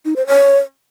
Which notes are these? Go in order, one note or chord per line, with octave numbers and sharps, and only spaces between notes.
D#4
C5
C#5